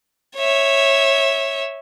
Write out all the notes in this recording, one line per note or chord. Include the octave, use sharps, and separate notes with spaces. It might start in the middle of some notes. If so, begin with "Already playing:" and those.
C#5 E5